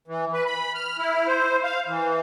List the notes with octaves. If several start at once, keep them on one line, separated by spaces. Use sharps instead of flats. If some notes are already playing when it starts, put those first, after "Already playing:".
E3
B4
B5
F6
E4
C5
F5
E3